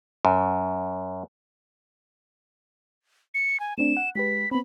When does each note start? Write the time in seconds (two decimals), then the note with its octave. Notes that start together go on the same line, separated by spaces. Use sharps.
0.25 F#2
3.34 C#7
3.60 G#5
3.78 A3 C4 D4 E7
3.97 F#5
4.15 G#3 G4 B4 B6
4.51 B3 C4 B5